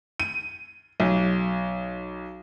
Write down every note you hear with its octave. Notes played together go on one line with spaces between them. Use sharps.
D#7
B1